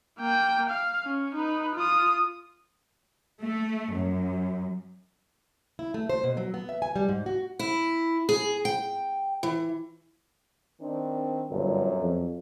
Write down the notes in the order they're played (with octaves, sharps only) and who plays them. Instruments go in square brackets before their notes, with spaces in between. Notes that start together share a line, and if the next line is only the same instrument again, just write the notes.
[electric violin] A#3 G5
F5
C#4
D#4 B4
F4 D#6
[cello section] A3
F#2
[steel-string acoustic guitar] E4
A3
C5
B2
F#3
B3
E5
G#5
G3
G#2
F#4
E4
G#4
G5
E3
[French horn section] D#3 C4 D4
[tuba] G1 [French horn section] F#2 A#2 F#3
[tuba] F2